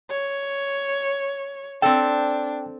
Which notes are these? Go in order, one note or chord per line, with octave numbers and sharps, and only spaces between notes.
C#5
C4 D4 A4 G5